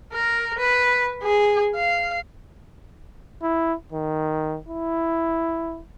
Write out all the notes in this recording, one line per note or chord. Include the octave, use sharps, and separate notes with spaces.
A#4
B4
G#4
F5
E4
D#3
E4